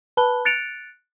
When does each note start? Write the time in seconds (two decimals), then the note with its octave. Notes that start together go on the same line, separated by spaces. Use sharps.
0.17 B4 A5 B5 F#6 G7
0.45 F#6 A6 C#7 D7 F7